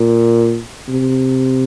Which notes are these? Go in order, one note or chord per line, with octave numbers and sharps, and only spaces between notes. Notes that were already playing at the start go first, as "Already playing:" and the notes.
Already playing: A#2
C3